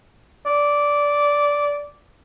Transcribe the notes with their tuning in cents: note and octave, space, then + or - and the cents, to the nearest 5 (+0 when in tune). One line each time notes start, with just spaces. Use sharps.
D5 -10